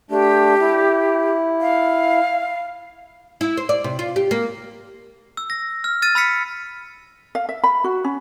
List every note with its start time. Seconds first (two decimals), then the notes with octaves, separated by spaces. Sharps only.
0.11 A3 D4 G4
0.61 E4
1.61 F5
3.41 E4
3.57 C5
3.69 D5
3.84 C3
3.99 F4
4.16 G4
4.31 A#3
5.37 E6
5.50 A#6
5.84 F6
6.02 F6 A6 D#7
6.15 B5 E6 F6 A6 B6 C#7
7.35 F5
7.49 E5
7.64 B5
7.84 F#4
8.04 C#4